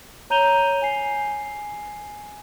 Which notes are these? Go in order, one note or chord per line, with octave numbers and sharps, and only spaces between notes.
C#5 A#5 G6 D#7 F7 G7
G#5 C7